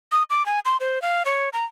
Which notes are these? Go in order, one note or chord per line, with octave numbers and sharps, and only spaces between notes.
D#6
D6
G#5
C6
C5
F5
C#5
A#5